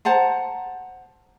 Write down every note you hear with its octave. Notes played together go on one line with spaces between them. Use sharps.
C5 F#5 A5 A#5